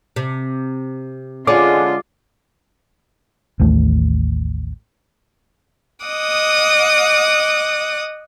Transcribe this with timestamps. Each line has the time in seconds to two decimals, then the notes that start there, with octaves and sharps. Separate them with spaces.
0.16 C3
1.47 D3 G#3 C#4 F4 G#4 D5 D6
3.60 A1 D#2 A3
6.05 D#5 F#5 D6 D#6